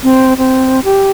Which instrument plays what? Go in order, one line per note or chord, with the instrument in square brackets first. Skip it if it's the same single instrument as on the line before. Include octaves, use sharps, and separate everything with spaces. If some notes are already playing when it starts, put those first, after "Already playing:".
[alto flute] C4
C4
G4